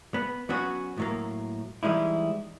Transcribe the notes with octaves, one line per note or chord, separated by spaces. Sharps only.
B3
F#3 B3 C#4 F#4
A2 F#3 A#3
E3 G3 G#3 D#4 E4